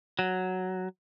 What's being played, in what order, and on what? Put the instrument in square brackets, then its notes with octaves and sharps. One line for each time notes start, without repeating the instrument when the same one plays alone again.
[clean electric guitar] F#3